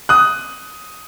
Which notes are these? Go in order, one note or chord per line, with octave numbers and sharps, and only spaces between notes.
D#6 F#6